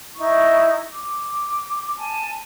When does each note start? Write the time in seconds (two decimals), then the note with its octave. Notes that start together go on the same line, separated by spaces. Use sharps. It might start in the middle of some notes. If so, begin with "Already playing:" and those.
0.16 D#4 E4 C#6
0.92 D6
1.98 G#5 A5